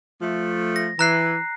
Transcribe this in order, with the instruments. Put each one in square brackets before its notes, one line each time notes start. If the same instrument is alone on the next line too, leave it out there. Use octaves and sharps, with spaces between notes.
[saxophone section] F3 A3
[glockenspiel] A#6
[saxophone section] E3 [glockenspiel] A#5 F#6 C7